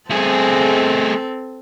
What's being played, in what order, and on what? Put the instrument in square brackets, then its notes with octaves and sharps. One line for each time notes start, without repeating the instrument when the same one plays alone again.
[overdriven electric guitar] A3 G#4 [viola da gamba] C4 A4